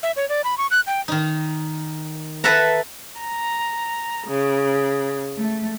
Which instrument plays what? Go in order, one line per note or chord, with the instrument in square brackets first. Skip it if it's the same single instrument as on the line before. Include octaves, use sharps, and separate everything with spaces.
[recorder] E5
C#5
D5
B5
C#6
F#6
G5
[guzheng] D#3 D#4
A4 B4 E5 F#5 A#5
[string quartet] A#5
C#3
A3